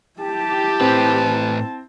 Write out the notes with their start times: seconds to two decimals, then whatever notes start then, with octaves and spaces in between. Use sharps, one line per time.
0.20 E4 G4 A5
0.81 A2 C4 B4